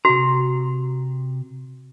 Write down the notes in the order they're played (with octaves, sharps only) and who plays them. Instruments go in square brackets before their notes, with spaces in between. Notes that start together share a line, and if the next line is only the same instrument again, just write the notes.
[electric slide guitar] C3 A#5 [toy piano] F#4